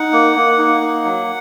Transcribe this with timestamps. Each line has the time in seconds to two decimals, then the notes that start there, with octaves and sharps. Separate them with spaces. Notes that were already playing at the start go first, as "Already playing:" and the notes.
Already playing: D#4 F#5
0.13 A#3
0.36 A#3
0.59 D#4
0.81 A#3
1.04 F#3